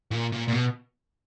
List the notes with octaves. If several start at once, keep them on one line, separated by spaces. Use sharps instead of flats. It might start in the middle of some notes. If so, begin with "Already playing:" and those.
A#2
A#2
A#2
B2